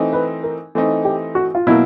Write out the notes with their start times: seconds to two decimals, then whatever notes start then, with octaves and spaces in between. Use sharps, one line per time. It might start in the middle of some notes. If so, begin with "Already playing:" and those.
Already playing: E3 A3 C4 D#4
0.13 B4
0.43 A#4
0.75 E3 A3 C4 D#4
1.05 G4
1.35 F#4
1.55 F4
1.67 B2 F#3 A#3 E4